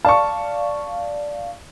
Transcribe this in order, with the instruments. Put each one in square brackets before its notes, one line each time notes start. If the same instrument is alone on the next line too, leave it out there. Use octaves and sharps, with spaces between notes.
[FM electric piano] D5 F5 [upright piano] A5 C#6